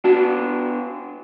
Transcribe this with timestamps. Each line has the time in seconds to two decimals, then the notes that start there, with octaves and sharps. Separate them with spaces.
0.04 B3 D4 F#4 A5